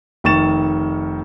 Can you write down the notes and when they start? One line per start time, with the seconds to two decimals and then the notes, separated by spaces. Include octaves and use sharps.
0.24 F1 D#3 C#6 A6 E7